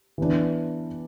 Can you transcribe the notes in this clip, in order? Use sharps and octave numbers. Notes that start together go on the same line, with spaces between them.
E3 B3 D4